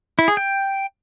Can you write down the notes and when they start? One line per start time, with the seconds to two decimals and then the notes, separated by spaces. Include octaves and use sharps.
0.19 E4
0.28 G#4
0.37 G5